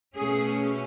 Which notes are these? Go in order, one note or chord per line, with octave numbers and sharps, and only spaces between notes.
B2 A3 C#4 G#4